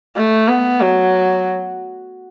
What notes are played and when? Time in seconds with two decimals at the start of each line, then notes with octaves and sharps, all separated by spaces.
0.17 A3
0.48 B3
0.81 F#3